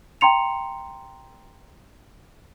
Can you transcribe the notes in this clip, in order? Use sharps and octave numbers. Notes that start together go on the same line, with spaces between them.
G5 A#5 C6 C#7 F7